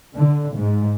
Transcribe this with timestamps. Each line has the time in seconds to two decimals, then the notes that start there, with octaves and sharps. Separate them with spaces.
0.13 D3
0.55 G#2